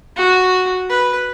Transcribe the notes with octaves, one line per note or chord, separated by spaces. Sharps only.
F#4
B4